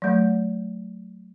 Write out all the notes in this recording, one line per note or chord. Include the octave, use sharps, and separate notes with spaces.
F#3 A3